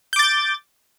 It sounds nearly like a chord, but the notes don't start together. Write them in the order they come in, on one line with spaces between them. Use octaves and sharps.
G6 D6 A6